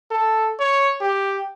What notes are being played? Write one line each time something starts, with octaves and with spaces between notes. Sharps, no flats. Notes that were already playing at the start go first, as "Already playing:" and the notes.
A4
C#5
G4